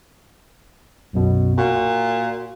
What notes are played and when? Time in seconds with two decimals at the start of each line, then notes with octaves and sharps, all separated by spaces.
1.13 B1 F#2 B2
1.58 A#2 F#4